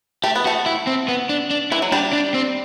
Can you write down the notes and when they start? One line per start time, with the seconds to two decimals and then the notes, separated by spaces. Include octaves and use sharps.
0.24 A3 G4
0.36 B3
0.45 A3 F#4
0.66 E4
0.87 C4
1.08 B3
1.29 D4
1.51 D4
1.72 E3 E4
1.82 F#3
1.92 G3 D4
2.13 D4
2.34 C4